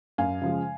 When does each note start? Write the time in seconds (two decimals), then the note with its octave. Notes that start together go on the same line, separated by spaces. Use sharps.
0.18 F#2 F5 G#5
0.42 C#3 F3 G#3